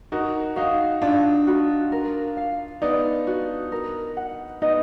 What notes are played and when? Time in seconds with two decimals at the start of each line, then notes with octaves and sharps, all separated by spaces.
0.12 D#4 F#4 A#4
0.56 D#4 F#4 F5
1.02 D4 F4 D5
1.47 F#4
1.92 A#4
2.37 F5
2.82 B3 D#4 D5
3.27 F#4
3.72 A#4
4.17 F#5
4.62 B3 D#4 D#5